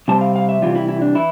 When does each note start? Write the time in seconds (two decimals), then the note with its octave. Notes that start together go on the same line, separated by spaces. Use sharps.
0.08 C3 G3 C4 A5
0.21 F5
0.36 F5
0.49 E5
0.62 C3 E3 G3 F4
0.75 E4
0.89 E4
1.02 D4
1.15 E3 E4